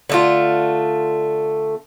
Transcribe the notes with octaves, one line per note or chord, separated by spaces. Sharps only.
D3 A3 F4